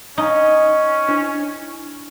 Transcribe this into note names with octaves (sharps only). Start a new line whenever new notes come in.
C#4 D#4
D4 E4